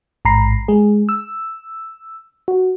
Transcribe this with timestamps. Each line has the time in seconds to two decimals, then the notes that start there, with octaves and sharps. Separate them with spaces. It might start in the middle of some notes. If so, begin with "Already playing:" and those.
0.25 A1 G#2 A#5 B5 C7
0.68 G#3 G#4
1.09 E6
2.48 F#4